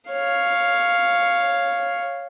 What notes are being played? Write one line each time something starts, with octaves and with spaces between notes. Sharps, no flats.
C#5 F5